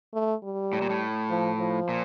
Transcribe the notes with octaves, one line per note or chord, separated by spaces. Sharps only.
A3
G3
A2
A#2
A2
F3
F3
A#2